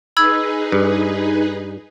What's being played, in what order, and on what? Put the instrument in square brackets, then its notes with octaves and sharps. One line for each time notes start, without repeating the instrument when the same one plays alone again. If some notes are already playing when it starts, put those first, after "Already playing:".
[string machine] D#4 G#4 B4 [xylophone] B5 E6 G#6
[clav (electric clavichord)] G2